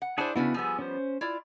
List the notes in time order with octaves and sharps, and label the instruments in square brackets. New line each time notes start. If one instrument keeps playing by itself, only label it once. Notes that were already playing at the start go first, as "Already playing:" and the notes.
[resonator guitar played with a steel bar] F#5
[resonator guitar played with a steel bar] D4 E4 C5 [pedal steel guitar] G#4 F#5 A5
[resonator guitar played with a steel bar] C#3 D4 F#4 [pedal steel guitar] B3 E4
[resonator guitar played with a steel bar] F3 G3 B3 [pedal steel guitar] G#4 G#5 E6
[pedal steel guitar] C#4 C5
[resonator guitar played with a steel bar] E4 F4 D5